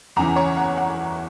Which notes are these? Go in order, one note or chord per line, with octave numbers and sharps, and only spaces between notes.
E2 C#3 E3 A#5
C#5
F#5
F#5